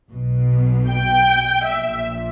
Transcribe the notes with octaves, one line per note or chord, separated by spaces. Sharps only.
B1 B2
G5
A#1 A#2 E5